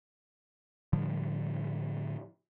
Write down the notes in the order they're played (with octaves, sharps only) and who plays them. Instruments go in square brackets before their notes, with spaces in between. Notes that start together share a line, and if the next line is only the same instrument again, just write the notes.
[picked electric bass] A2 D3 F3 G3